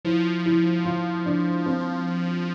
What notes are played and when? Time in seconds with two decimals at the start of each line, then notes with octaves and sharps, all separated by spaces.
0.05 F3 E4
0.46 E4
0.85 F4
1.26 D4
1.66 C4